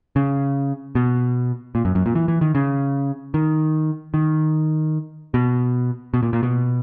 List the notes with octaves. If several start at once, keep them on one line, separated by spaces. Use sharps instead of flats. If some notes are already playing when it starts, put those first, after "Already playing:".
C#3
B2
A#2
F#2
F#2
A#2
E3
E3
D#3
C#3
D#3
D#3
B2
B2
A#2
A#2
B2